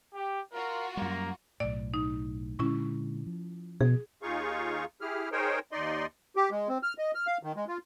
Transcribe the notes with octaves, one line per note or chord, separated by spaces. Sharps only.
G4
F4 F#4 A#4
F#2 G3 A#3 A#5
B1 A2 D5
D#4
A#2 D3 G#3 C#4 E4 C#6
F3
B2 G#4
D#2 D#4 F4 G#4 F5 C#6
E4 G4 G#4 F6
D#4 G#4 A#4 C5 C#5 G5
D#2 D#4 D5 D#5 C6
G4
G#3
C4
F6
D#5
F6
F5
D#3
G#3
F4